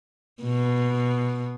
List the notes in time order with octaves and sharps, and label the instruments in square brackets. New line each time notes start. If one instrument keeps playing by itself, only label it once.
[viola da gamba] B2